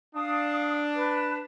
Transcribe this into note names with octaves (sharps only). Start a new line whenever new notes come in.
D4 F5 D#6
B4 A5